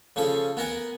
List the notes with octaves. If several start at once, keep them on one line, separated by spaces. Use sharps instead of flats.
C#3 F3 C#4 A4
B3 A#4 F#5 G#5